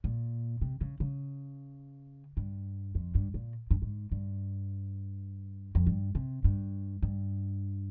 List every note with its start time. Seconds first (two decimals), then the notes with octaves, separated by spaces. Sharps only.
0.04 A#2
0.61 C3
0.81 C#3
1.00 C#3
2.37 G2
2.95 F2
3.15 G2
3.34 A#2
3.71 G2
3.82 G#2
4.12 G2
5.75 F2
5.87 G2
6.15 C3
6.44 G2
7.02 G2